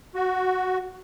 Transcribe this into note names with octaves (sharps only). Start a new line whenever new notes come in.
F#4